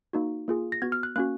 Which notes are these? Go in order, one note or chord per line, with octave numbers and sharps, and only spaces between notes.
A#3 D#4 F#4
A#3 F4 G#4
A#6
B3 F#4 G#6
F6
F#6
A#3 C#4 F#4 F#6